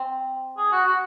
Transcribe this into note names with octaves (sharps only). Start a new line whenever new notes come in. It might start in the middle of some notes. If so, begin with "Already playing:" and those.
Already playing: C4
G#4
F#4
F#4